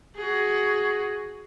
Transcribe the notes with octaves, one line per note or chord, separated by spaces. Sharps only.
F#4 G#4